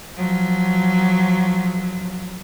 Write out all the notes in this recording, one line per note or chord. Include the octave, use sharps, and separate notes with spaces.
F3 F#3